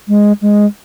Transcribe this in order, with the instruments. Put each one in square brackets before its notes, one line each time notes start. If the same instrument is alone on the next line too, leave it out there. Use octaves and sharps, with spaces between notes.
[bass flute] G#3
G#3